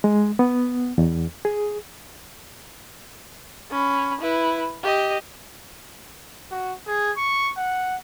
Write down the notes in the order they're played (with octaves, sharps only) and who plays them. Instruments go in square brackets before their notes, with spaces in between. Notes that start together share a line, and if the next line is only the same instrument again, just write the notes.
[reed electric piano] G#3
B3
E2
G#4
[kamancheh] C#4 B5
E4 B4
G4 D#5
[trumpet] F#4
G#4
C#6
F#5